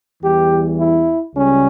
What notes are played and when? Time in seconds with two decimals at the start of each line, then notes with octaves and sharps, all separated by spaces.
0.21 E2 E3 G3 G4
0.78 E4
1.34 C#2 C#3 G3 C#4